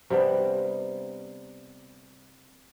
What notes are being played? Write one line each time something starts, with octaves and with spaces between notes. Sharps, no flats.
C3 G3 B3 D4